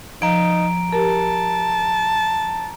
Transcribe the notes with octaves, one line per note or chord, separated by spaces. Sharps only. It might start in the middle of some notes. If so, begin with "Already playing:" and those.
F3 D#4 A#5 D7
G4 A#4 A5